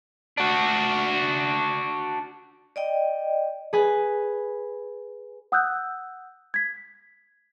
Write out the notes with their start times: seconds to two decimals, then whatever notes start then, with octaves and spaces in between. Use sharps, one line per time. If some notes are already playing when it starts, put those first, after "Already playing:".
0.37 D4 F#4
2.76 D5 D#5 G5
3.73 G#4 B4 G#5
5.52 F#5 D#6 E6 F#6 G6
6.54 G#6 B6